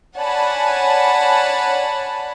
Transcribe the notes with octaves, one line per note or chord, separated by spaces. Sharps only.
C#5 D5 F#5 G#5 A5 B5